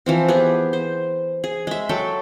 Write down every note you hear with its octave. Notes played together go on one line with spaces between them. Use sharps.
E3 F3 C4
B3 G4 G#4
C5
G#4
G#3 E5
F#3 A4 G5 A5